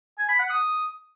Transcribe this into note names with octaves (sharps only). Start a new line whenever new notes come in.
G#5
B5
F#5
D#6